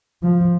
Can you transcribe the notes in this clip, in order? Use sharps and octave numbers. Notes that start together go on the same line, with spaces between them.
F3